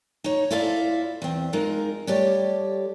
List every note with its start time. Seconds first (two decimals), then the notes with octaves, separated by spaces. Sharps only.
0.24 D#4 C#5
0.51 E4 F4 A4 C5 D5 F5
1.22 E2 C4
1.53 G#3 D#4 F4 A#4
2.07 G3 A3 G4 A4 C#5 D5